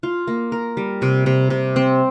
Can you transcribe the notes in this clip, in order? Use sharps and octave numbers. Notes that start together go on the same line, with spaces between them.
F4
A#3
A#4
G3
C3
C3
C3
C4